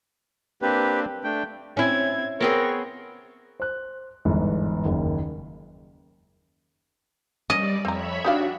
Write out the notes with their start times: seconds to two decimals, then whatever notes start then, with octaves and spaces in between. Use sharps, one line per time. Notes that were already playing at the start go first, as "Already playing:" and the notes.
0.62 A#3 C4 D4 G4 B4
1.24 A3 D4 G5
1.77 C4 C#4 E4 G#6
2.41 B3 C4 G#4 A#4 C#5 C#6
3.60 C5 F#6
4.25 G1 E2 G#2
4.85 F#1 D#2
7.50 G3 C#4 D5 D#5
7.85 F2 C4 C#5 E5 A#5 B5
8.25 D4 D#4 F#4 G4 F5